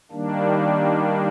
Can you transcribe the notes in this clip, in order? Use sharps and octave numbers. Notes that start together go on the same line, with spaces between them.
D#3 G3 A#3 D4